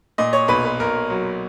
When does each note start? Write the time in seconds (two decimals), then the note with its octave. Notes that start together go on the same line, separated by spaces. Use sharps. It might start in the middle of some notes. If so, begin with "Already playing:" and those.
0.18 A#2 D#5
0.33 C#5
0.48 B1 B4
0.65 B4
0.80 B1 A#4
1.10 F#3